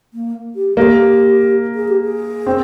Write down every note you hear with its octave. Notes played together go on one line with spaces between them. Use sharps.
A#3
G4
G#4
A#3 G4
G#4
G4
G#4
C4